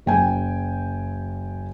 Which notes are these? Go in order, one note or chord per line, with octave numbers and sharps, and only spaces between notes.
F#1 G5 G#5